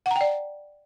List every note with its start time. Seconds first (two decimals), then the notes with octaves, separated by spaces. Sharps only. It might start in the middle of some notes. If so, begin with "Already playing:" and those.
0.06 F#5
0.11 A#5
0.16 G5
0.21 D5